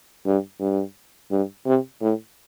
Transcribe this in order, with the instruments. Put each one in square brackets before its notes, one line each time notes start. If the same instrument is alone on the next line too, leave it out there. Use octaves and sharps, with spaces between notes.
[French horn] G2
G2
G2
C3
A2